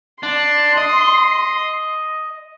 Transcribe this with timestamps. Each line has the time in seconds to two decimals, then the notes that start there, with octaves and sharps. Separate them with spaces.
0.23 D4 C6
0.77 D#5